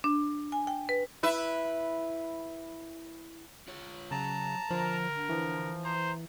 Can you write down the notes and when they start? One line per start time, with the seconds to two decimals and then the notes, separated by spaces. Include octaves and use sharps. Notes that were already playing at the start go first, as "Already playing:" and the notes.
0.04 D4
0.52 G#5
0.67 G5
0.89 B4
1.23 E4 B4 E5
3.68 F4 C#5
4.11 C#3 F#3 A5 A#5
4.71 D3 F3 D4 A#4
5.29 E3 F3
5.85 C5 A#5